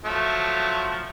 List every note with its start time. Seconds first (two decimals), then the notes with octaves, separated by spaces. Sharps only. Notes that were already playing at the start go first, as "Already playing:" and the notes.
0.05 F3 F#3 A3